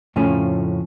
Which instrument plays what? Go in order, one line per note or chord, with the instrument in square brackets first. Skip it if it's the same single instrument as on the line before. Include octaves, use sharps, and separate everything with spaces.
[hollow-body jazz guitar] F2 A2 C#3 F3 A3 C#4